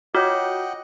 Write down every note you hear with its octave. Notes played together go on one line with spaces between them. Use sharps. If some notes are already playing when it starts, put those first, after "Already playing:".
F4 F#4 C#5 D#5 F#5 G5 D6 F6